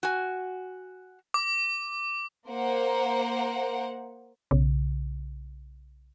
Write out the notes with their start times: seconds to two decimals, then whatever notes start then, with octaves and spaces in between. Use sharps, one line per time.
0.03 F#4 G#5
1.34 D6
2.49 A#3 A#4 C5 F#5
4.51 B1 C#3